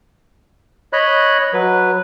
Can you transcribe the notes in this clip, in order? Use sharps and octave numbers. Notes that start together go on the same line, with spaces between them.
C#5 D#5 B5 F#6
F#3 B4